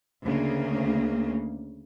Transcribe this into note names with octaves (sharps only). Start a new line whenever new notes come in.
D2 C#3 A#3